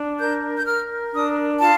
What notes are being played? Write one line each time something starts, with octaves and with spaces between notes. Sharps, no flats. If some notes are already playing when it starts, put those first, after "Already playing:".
Already playing: D4
A#4 G6
G6
A#4 F6
D4 D#6
F4 A5